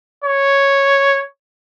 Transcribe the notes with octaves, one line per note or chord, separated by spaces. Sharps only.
C#5